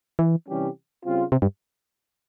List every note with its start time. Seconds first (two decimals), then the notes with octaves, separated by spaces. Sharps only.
0.19 E3
0.47 C3 E3 G3 C#4 G4
1.04 C#3 G3 C4 F4
1.32 C3
1.42 G2